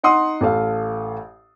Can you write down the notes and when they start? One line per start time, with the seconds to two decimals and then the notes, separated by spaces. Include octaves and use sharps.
0.03 D#4 F#5 C6 D#6
0.41 A1 A4 F5